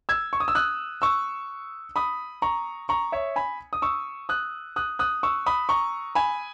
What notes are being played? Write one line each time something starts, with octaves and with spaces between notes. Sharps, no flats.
E6 G#6
C#6
D#6
E6
D#6 F#6
C#6 E6
B5 D#6
A#5 C#6
A#5 C#6
C#5 E5
G#5 B5
D#6
C#6 E6
D#6 F#6
D#6 F#6
D#6 F#6
C#6 E6
B5 D#6
A#5 C#6
G#5 B5